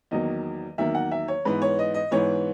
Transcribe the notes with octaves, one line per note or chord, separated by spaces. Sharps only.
E2 D#3 F#3 A#3 D#5
E2 D#3 F#3 A#3 E5
F#5
E5
C#5
G#2 E3 B3 B4
C#5
D#5
D#5
G#2 E3 B3 C#5